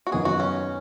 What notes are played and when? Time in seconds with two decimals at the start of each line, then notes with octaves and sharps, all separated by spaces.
0.07 F#4
0.12 F#2 D#3 B3 D#4 G#4
0.25 F#4
0.40 C#4